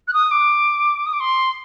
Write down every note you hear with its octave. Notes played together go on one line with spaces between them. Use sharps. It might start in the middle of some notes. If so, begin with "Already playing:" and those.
F#6
D#6
D6
D#6
D6
C6